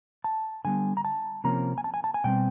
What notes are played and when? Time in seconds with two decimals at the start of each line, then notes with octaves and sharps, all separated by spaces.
0.24 A5
0.65 D3 G3 B3 G#5
0.97 A#5
1.05 A5
1.44 C3 F3 A#3 C#4 A#5
1.78 G#5
1.84 A5
1.94 G#5
2.04 A5
2.14 G#5
2.24 B2 G3 C4 G5